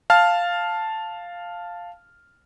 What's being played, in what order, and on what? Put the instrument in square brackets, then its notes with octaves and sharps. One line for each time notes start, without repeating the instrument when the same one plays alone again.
[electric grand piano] F5 A5 F6